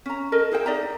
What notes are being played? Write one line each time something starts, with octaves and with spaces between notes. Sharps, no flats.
C#4 A#5
A4 A#4 D#5
E4 G#4 C5 G5
D#4 D5 E5 A#5